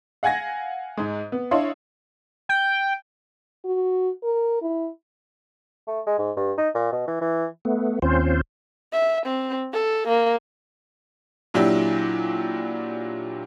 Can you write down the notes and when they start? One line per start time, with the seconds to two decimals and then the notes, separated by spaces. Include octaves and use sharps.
0.23 F5 F#5 G#5 G#6 A#6
0.97 G#2 G#3
1.32 B3
1.51 D4 E4 C#5 D#5 F5 C6
2.49 G5
3.65 F#4
4.23 A#4
4.62 E4
5.87 A3
6.07 G#3
6.18 G#2
6.37 G2
6.58 D#4
6.75 A#2
6.92 B2
7.08 E3
7.21 E3
7.65 A3 B3
8.02 D#2 C4 C#4 F4 C5
8.93 E5
9.26 C4
9.73 A4
10.08 A#3
11.54 A#2 F#3 D4 E4 G4